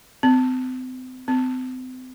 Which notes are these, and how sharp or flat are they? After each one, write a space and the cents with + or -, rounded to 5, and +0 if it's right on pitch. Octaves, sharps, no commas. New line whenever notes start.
C4 -40
C4 -40